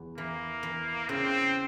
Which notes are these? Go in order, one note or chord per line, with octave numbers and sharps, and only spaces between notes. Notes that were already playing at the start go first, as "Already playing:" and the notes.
Already playing: E2
E3 A#3
E3
C#3 C4